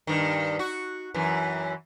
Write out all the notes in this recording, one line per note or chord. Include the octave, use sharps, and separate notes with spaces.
G2 D#3
F#4
F#2 E3